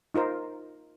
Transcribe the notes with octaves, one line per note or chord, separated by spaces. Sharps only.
D#4 F4 A#4 C5